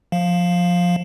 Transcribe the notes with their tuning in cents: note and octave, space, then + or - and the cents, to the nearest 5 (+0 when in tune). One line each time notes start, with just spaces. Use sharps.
F3 +20 F5 +0